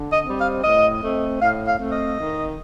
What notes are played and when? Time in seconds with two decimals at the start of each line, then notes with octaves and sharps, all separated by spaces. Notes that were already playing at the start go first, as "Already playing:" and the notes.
Already playing: D3
0.12 D#5
0.25 G3 C4
0.38 F5
0.64 A2 D#5
1.02 A3 C4
1.41 A2 F5
1.67 F5
1.79 A3 C4
1.91 D#5
2.18 D#3